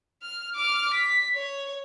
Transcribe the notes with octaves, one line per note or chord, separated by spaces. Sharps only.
F6
D6 F6
B6
C#5